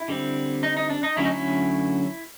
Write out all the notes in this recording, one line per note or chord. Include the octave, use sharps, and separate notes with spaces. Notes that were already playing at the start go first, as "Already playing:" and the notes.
Already playing: E4
D3 G3 C4
D#4
D#4
D4
D#4
D3 F#3 A3 C#4 E4
D#4
E4